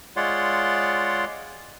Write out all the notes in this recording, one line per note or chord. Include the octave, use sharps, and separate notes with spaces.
G#3 F4 C#5 D5 F#5 C6